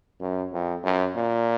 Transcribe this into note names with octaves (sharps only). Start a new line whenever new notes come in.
F#2
F2
F#2
A#2